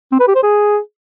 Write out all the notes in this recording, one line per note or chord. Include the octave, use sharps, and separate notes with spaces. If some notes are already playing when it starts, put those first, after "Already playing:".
C4
B4
G4
C5
G#4